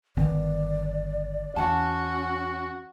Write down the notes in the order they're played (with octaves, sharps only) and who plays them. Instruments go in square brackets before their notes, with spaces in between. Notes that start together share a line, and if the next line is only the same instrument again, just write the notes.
[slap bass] G1 D#3 B3 [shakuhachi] D5
[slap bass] E2 [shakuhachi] C#4 [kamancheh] F#4 [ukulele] D5 F#5 A5